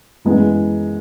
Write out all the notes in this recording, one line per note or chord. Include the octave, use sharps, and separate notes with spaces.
F#2 E3 G#3 B3